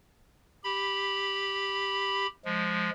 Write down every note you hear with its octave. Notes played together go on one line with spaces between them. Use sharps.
G4 B5
F3 G#3